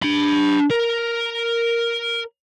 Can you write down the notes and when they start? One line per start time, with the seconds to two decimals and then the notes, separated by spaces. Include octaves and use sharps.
0.03 D4 B5
0.70 A#4